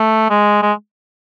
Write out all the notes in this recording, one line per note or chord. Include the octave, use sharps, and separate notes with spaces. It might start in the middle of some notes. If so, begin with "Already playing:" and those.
Already playing: A3
G#3
G#3